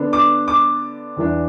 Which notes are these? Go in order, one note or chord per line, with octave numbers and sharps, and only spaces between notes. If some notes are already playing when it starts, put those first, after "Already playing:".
Already playing: D3 B3 D4
D6
D6
E2 E3 D4